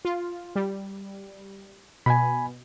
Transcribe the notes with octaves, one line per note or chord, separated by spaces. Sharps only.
F4
G3
B2 G#5 B5